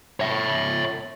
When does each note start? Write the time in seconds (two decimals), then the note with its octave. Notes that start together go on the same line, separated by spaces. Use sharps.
0.20 C#5 E5